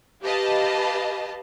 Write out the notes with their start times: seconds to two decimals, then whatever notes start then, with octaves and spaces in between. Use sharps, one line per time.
0.22 G4 B4 D#5 F5 A5